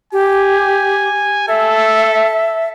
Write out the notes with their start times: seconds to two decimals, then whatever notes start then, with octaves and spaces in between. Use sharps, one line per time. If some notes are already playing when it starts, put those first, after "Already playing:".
0.13 G4 G#5
1.48 A4 E5